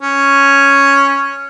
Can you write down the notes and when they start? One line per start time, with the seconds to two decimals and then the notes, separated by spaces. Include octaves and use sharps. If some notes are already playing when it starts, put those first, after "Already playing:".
0.01 C#4